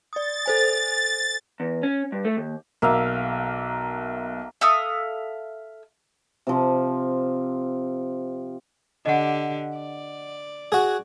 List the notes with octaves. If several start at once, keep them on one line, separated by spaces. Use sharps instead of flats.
D5 D#6 A6
A4 C5 G#5
E2
C#4
G2
A3
D#2
B1 A#3 E5 F5
A4 E5 F5 D#6
C3 F3
D3 G4 D#5 F#5
D5
F#4 G#4